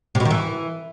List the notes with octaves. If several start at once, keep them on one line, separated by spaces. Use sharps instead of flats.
C3
B2
D#3
E3